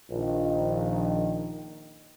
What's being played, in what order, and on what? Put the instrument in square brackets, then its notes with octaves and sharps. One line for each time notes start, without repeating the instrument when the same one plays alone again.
[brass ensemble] A#1 D#3